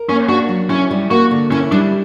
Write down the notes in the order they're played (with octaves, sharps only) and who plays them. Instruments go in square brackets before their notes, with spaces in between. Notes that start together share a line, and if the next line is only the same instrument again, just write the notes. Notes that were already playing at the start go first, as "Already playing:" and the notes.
Already playing: [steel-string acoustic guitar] A#4
[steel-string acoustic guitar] A#3 [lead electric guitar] C#4
[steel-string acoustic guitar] D4 [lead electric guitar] F#4
[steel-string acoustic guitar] F#3
[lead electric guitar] C#4 [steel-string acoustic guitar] E4
[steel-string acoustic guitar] G3
[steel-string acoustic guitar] A#3 [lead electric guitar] F#4
[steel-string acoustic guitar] D3
[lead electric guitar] C#4 [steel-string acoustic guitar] E4
[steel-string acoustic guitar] G3 [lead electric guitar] D4